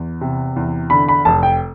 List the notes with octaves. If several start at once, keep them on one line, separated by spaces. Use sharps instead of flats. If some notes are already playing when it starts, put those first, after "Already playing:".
Already playing: E2 E3
C3
E2
D3 B5
B5
F1 A5
G5